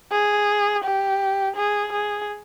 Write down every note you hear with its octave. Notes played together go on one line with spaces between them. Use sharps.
G#4
G4
G#4
G#4